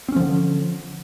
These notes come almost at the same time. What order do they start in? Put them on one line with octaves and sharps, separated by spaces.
C4 C#4 F3 D3